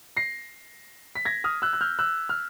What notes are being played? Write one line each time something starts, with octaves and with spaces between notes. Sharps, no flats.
A#6 C7
B6
G#6 A#6
D#6 F6
E6 F#6
F#6
F6 G6
E6 F#6
F6